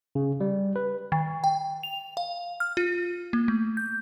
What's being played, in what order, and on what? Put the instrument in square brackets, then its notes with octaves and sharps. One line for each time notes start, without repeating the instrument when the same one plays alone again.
[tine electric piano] C#3
G3
B4
[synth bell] D#3
G5
F7
F5
F6
F4
A#3
A3
G6